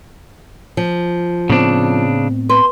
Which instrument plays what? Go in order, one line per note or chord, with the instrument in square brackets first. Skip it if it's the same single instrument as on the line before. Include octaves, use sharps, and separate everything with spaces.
[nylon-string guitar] F3
[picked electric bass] A2 B3 C4 [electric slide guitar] C#3 D4
[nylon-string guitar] B4 [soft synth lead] C6